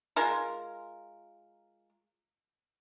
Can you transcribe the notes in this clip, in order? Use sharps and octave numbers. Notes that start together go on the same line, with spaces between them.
G#3 F4 A#4